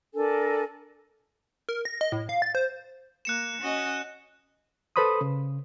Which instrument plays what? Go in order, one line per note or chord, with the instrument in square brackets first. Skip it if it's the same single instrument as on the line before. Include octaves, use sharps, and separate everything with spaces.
[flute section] D4 A4 A#4 G#5
[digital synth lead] A#4
A#6
D#5
A2
F5
A6
C5
[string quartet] A#3 [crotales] F#6 C#7 E7
[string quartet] C#4 F#4 D#5
[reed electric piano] A4 B4 C5 B5 C6 D#6
C#3